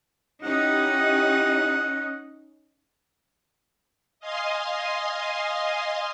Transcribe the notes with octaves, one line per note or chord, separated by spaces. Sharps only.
C#4 D#4 E4 G4 F#5
D#5 F5 G#5 C6